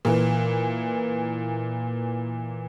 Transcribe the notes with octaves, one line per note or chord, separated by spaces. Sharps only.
A#2 E3